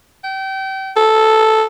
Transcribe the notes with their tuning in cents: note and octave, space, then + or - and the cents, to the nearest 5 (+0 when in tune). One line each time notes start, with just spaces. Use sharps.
G5 -30
A4 -5